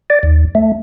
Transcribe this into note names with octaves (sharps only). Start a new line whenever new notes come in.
D5
D#2
A3